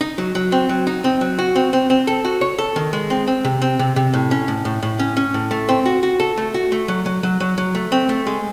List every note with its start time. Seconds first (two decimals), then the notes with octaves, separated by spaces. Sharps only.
0.01 D#4
0.18 F#3
0.35 F#3
0.52 C4
0.69 F#3
0.87 D#4
1.04 C4
1.21 F#3
1.39 F#4
1.55 C4
1.73 C4
1.90 C4
2.07 A4
2.25 F#4
2.41 C#5
2.58 A4
2.76 D#3
2.93 G#3
3.10 C4
3.27 C4
3.45 C3
3.62 C4
3.79 C3
3.96 C3
4.14 A2
4.31 C#4
4.48 A2
4.65 A2
4.83 A2
4.99 C#4
5.17 C#4
5.34 A2
5.51 A3
5.69 C4
5.86 F#4
6.03 F#4
6.20 A4
6.37 A3
6.54 F#4
6.72 A3
6.88 F#3
7.06 F#3
7.23 F#3
7.40 F#3
7.58 F#3
7.75 A3
7.92 C4
8.09 A3
8.27 G#3